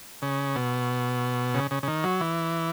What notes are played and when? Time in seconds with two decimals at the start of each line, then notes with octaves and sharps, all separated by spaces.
0.22 C#3
0.55 B2
1.54 C#3
1.71 C#3
1.83 C#3
1.88 D#3
2.04 F#3
2.21 E3